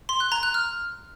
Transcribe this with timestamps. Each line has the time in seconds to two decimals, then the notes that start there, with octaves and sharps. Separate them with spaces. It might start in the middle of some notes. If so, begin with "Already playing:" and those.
0.09 C6
0.20 F#6
0.32 A#5
0.43 F#6
0.54 F6